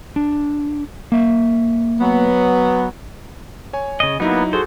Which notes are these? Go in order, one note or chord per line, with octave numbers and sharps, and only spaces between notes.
D4
A#3 E5
F#3 B3
C#5 G#5
C#3 D#5
F#3 A#3 B3 D#4 E4
F#4 G#4 A4 C5